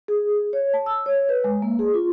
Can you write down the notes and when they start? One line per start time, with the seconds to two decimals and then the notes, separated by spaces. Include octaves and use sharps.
0.08 G#4
0.53 C#5
0.74 A5
0.86 E6
1.06 C#5
1.29 B4
1.44 G#3
1.62 A#3
1.79 G#4
1.94 F4